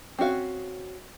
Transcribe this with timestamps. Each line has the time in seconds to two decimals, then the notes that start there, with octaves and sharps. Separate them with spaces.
0.19 C4 C#4 F#4 F5